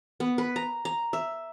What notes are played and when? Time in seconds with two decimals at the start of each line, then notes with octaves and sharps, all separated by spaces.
0.20 B3
0.38 B4
0.56 A#5
0.85 A#5
1.13 E5